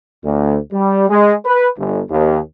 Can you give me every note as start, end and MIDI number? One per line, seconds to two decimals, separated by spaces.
0.24 0.57 38
0.73 1.07 55
1.10 1.34 56
1.45 1.68 71
1.77 2.00 31
2.10 2.39 39